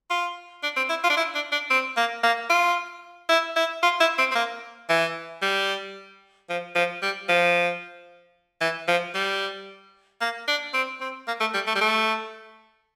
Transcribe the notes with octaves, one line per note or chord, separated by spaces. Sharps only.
F4
D4
C4
E4
F4
D4
E4
D4
D4
C4
A#3
A#3
F4
E4
E4
F4
E4
C4
C4
A#3
E3
G3
F3
F3
G3
F3
E3
F3
G3
A#3
D4
C4
C4
A#3
A3
G3
A3
G3
A3